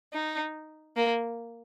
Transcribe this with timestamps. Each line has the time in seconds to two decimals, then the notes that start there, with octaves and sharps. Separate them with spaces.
0.13 D#4
0.96 A#3